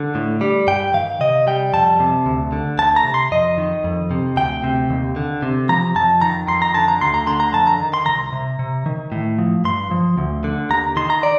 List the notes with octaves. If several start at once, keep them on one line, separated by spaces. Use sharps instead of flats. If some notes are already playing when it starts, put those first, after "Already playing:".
Already playing: D3
A2
G3
G2 G5
D#3 F5
C3 D#5
G3 G5
F2 A5
C3
D2
D3
D2 A5
A#5
C3
C6
F2 D#5
D#3
F2
C3
D2 G5
C3
D#2
D3
C3
F3 A#5
F2 A5
D#3 A#5
F2 C6
A#5
D3 A5
A#5
D2 C6
A#5
D3 C6
A#5
F2 A5
A#5
D#3
C6
C2 A#5
C3
C3
D#3
A2
F3
G2 C6
F3
D2
D3
D#2 A#5
D#3 C6
A#5
D5